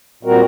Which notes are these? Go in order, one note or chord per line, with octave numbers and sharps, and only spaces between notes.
A#2 G3 C4 F#4 A#4